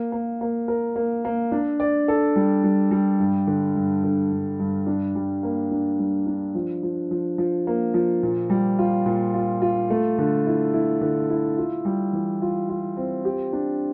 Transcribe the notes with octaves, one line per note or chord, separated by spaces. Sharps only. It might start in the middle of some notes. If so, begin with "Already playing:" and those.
Already playing: A#3
A#3
A#3
A#4
A#3
A#3
D4
D5
A4
G3
G3
G3
G2
D3
G2
D3
G2
G2
D4
G3
A#3
D4
G3
D4
F3
F3
F3
F3
A#3
F3
A#2
G3
F4
A#2
F4
F4
A3
D3
E4
E4
D3
E4
F4
G3
E3
F4
F4
C4
G4
D4